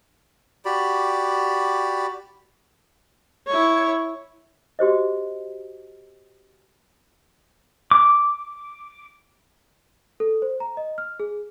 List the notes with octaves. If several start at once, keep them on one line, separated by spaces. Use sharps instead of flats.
F#4 G4 D5 B5
E4 C#5
F#4 G4 C5 D#5
D6
A4
C5
A#5
D#5
F6
G#4